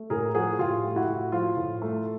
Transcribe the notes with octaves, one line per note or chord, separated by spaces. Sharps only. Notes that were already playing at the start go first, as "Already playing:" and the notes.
Already playing: A3
A2 G#4 A#4
F3 F#4 G#4
A2 F4 G4
A3
E4 F#4
A2
F3 F4
A2
A3